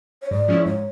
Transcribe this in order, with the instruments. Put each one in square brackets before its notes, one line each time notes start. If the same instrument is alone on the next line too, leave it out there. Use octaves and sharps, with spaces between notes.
[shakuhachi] C#5
[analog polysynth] G#2 [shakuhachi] D5
[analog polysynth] F3 G#3 C#4 E4
[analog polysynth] G#2 [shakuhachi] C#5